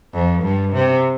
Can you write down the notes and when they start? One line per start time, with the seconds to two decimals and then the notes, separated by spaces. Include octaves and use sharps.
0.14 F2
0.43 G2
0.73 C3